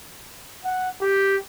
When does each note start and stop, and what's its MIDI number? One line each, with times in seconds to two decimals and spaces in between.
0.65 0.90 78
1.01 1.36 67